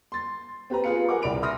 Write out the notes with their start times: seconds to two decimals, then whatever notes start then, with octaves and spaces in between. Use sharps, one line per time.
0.12 C6 A6
0.70 C4 G4 B4 A#5
0.84 F4 G#4 B4 F5 C#7
1.09 G#4 A#4 F#5 G#5 D6
1.22 C2 D5 B5 D7 F7
1.42 E5 B5 C6 D#6 F6 A#6